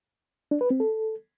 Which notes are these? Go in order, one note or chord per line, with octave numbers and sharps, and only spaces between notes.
D4
B4
C4
A4